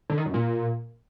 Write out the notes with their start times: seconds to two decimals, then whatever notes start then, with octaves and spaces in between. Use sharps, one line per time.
0.10 D3
0.18 D#3
0.26 F#2
0.34 A#2